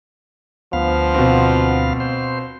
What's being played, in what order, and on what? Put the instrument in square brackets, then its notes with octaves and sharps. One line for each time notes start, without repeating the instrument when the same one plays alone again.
[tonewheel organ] D2 B3 F5 [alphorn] F3
[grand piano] B2 C4
[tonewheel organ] C5